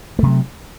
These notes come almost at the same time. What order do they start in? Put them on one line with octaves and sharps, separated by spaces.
A3 C3 F#3